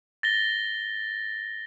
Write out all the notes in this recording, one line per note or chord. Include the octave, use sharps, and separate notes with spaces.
A6 A#6 G7